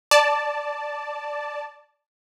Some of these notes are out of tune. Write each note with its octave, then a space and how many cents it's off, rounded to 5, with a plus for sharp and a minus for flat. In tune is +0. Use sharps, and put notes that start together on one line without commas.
D5 +0 A5 +0